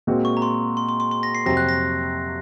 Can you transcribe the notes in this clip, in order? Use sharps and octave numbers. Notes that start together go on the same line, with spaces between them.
A#2 G#3 C4 F#4
C#6
A#5
C6
C6
C6
C6
C6
A#6
C7
F2 C3 F#3 C4 F#4 A#6
F#6
A#6